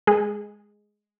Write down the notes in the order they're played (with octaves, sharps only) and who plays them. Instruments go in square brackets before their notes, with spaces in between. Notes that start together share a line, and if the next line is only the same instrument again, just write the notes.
[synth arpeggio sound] G#3 G#4